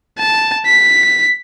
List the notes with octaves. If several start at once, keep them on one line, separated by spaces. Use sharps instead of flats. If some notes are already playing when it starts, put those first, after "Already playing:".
A5
B6